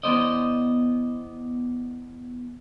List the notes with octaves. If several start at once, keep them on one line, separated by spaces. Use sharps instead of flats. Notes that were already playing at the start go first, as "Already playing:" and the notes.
E2 B3 C5 D5 D#5